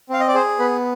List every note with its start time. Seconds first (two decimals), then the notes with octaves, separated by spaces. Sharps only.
0.10 C4 F5
0.20 D#5
0.28 D5
0.34 G#4 C5
0.59 B3 B4